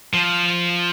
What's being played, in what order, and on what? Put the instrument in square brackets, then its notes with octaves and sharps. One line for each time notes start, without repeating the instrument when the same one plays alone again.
[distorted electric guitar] F3